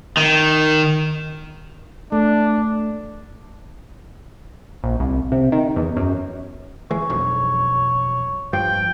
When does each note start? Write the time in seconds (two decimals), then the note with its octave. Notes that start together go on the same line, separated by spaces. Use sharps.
0.17 D#3
2.12 A3 D4
4.83 A#1
5.00 C2
5.32 C3
5.52 D#3
5.76 E2
5.97 F#2
6.91 E3 G#3 C#5
7.09 E1 B1 F2
8.53 G2 F3 G5